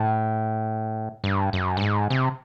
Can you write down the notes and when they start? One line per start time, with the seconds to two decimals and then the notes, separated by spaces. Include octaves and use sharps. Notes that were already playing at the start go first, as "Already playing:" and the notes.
Already playing: A2
1.24 G2
1.53 F#2
1.77 G2
1.82 G#2
2.10 C3